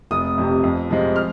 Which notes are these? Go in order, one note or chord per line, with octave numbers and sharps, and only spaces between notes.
F1 D#6
F2 C3
F2
C3 F3 G#3
F6